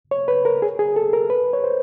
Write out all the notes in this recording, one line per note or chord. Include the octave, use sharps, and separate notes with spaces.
C#5
B4
A#4
G#4
G#4
A4
A#4
B4
C#5
C5